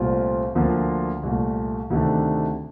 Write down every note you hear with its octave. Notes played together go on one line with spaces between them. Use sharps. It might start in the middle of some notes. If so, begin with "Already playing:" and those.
Already playing: C2 A#2 A3 C4 F4
D2 D3 F3 A#3 F4
C2 A#2 A3
D2 C3 D#3 A3 D4